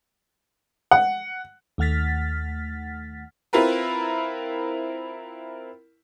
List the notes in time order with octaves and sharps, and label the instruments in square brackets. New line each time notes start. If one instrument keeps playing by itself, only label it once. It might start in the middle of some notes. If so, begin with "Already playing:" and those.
[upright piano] F#5
[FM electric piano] D#2 A3 F#5 F6 A6 B6
[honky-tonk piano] C4 E4 F4 A#4 B4